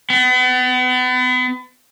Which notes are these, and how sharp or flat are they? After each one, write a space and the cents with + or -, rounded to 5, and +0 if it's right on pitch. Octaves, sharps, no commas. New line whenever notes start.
B3 +35